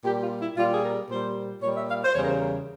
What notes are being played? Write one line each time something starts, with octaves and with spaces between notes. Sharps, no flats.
A#2 G3 G4
F4
E4
A#2 G3 F4
G#4
A#4
A#2 G3 C5
A#2 G3 C#5
E5
F5
C5
E2 C#3 G3 C#5
A#4
C5
A#4